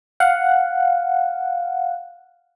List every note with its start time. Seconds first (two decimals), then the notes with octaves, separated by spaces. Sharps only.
0.20 F5 F#5